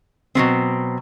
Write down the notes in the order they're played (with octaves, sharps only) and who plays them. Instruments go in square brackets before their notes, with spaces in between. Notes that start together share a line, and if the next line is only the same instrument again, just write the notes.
[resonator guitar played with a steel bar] B2 F#3 A3 C4